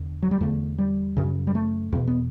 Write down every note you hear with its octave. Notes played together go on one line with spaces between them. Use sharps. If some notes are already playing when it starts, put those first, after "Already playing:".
Already playing: E2 D3
F#3
G3
E2 D3 A3
G3
F#2 C#3
G3
A3
E2 B2
B3